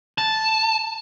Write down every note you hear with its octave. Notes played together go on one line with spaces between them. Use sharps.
A5